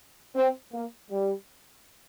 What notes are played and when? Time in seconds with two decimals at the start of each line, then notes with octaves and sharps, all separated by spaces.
0.36 C4
0.72 A#3
1.10 G3